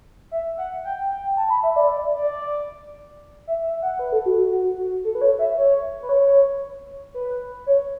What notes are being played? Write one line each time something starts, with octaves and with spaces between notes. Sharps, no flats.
E5
F#5
G5
G5
A5
B5
E5
D5
D5
D5
E5
E5
F#5
B4
A4
F#4
F#4
F#4
F#4
A4
B4
C#5
E5
C#5
B4
C#5
B4
C#5